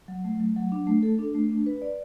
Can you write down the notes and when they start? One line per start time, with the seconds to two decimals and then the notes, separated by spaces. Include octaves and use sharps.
0.08 F#3
0.24 A3
0.40 F#3
0.56 F#3
0.72 D4
0.87 A3
1.03 A4
1.19 D4
1.34 A3
1.50 D4
1.66 B4
1.82 D5